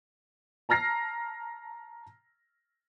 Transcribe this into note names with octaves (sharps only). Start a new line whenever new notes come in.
A5 A#5 F6 A#6 C7